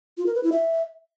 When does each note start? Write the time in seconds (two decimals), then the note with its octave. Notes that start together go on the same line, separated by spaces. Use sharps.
0.18 F4
0.26 A#4
0.35 B4
0.43 E4
0.52 E5